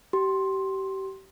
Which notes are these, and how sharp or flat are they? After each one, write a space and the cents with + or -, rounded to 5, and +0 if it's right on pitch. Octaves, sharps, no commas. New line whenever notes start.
G4 -30 C6 +10